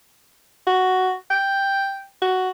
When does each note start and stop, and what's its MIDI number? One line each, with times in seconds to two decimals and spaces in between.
0.67 1.14 66
1.30 2.06 79
2.22 2.49 66